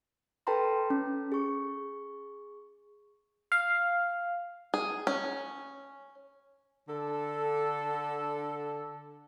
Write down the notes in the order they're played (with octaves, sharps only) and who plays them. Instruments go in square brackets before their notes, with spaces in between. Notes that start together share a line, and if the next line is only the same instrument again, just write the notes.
[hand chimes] A4 B4 G5 A5 A#5 C6
C#4
G#4 C#6
[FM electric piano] F5
[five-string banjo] G#4
C#4
[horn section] D3 A4